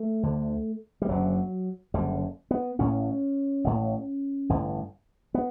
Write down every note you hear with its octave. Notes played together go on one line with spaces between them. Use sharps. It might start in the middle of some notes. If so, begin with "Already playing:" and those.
Already playing: A3
D2 D3
G3
F#1 F#2 D3 F#3
F#1 F#2 D3 G3
B3
A1 A2 C#4
A1 A2
A1 G2 D3
B3